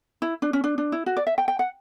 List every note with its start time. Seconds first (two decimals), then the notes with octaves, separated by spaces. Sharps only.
0.22 E4
0.42 D4
0.53 C#4
0.64 D4
0.78 D4
0.92 E4
1.06 F#4
1.17 D5
1.27 E5
1.38 G5
1.48 G5
1.59 F#5